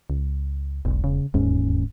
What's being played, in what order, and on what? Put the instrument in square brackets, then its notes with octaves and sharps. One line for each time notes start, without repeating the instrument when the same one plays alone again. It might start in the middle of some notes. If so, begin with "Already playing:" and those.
[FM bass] C#2
[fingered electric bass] E1 [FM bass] B1
[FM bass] C#3
[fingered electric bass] E1 D#2 C#4 [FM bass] G#2